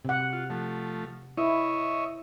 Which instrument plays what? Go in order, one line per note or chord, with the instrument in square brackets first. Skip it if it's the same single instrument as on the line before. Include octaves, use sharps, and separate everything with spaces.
[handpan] C3 F#5
[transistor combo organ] F4
F3 A3
[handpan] E4 [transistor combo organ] C#5 D#5 E5